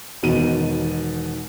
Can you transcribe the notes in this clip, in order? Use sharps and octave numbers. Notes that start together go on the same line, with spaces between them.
E1 B2 D#3 D#7